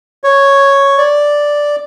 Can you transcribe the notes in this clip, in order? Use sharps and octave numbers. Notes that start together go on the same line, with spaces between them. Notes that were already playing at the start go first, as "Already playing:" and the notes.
C#5
D5